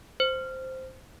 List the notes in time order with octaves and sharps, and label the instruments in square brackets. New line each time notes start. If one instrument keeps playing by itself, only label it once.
[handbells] C5